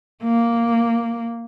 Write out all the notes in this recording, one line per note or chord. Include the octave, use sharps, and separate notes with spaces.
A#3